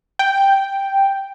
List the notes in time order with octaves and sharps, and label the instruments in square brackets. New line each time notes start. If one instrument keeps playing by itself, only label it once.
[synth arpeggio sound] G5